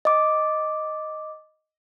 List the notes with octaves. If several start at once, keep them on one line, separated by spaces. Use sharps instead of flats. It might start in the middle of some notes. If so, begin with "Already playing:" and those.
D#5 D6